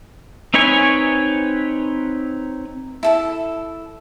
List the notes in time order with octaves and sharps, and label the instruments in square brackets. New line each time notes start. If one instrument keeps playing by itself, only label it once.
[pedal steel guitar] C4 D#4 B4 C#5 G#5
[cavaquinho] E4 A4 A5